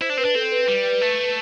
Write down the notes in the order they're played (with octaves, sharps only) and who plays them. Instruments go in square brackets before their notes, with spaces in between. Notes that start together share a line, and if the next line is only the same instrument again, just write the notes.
[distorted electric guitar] E4 [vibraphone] C5
[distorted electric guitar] D4
[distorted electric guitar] C4 [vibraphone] B4
[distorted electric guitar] D4
[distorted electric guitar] C4 [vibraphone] A4
[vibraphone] B4
[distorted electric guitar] G3 [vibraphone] B4
[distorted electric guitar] A3